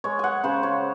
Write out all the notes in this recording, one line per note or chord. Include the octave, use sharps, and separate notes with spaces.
G#3 C#5
F#5 G#5
C#3 C5
C#5